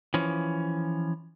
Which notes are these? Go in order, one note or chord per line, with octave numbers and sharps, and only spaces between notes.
E3 F3 C#4